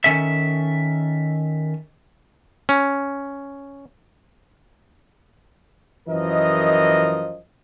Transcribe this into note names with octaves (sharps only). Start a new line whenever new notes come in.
D#3 C#4 A4 E5
C#4
F#2 E3 F3 A#4 D#5